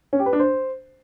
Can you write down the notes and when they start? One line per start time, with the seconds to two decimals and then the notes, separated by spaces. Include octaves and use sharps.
0.13 C#4
0.19 G4
0.26 B4
0.33 D4
0.40 C5